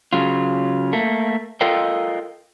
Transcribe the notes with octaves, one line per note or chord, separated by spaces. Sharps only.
C#3 F#3 F4
A3 A#3
F4 A4 A#4 D#5 F5 G5